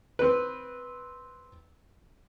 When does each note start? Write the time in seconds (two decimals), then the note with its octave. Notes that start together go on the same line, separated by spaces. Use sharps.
0.19 C4 B4